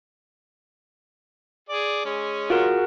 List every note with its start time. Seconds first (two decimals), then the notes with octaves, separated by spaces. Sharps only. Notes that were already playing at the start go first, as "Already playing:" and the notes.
1.69 G#4 D5
2.05 G#3 C#4
2.50 F4 F#4 G#4 A#4